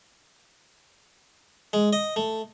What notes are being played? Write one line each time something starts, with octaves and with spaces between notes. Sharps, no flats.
G#3
D#5
A3